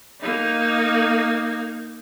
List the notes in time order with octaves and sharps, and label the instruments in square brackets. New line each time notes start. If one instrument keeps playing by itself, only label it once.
[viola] A#3 D#4